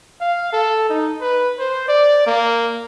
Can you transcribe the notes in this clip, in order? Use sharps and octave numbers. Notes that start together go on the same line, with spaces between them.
F5
A4
D#4
B4
C5
D5
A#3